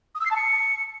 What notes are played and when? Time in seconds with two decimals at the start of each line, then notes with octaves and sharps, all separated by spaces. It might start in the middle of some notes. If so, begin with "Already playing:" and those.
0.15 D#6
0.20 E6
0.25 C7
0.31 A5
0.36 C#7